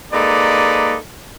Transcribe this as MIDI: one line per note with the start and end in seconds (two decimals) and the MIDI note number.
0.13 0.97 56
0.13 0.97 58
0.13 0.97 63
0.13 0.97 69
0.13 0.97 71
0.13 0.97 74